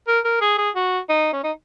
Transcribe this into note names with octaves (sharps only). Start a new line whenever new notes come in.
A#4
A#4
G#4
G#4
F#4
D#4
C#4
D#4